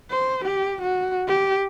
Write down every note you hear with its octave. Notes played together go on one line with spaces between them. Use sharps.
C5
G4
F#4
G4